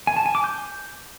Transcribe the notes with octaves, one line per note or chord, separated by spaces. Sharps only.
G#5
A5
G#5
D6
G6